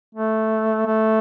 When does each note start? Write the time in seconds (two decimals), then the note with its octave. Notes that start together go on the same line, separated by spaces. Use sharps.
0.15 A3
0.86 A3